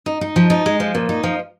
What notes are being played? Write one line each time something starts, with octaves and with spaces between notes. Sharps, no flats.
D#4
D#4
F3
D#4
G#3
F3
A#2
D#4
F3